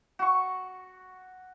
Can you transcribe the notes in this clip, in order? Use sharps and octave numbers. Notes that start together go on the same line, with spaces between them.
F#4 C#6